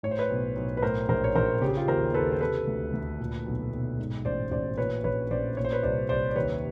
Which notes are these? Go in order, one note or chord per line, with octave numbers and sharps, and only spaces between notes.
A2 C#5
C5
B4 C#5
B1
B1
B4
A2 A#4 C5
A#1 A#4 C5
C#5
A#1 A#4 C5
C#3 G4
G#4
F4 G4
D#2 A#4 C5
D#2 A4 B4
C5
C3 A4 B4
D2
D2
A#2
B1
B1
G#2
A1 C5 D5
A1 C5 D5
A#2 B4 C#5
A#1 B4 C#5
A#1 C5 D5
A#2 C#5
C5
B4 C#5
C2 C5 D5
C2 C5 D5
D5
D#2 B4 C#5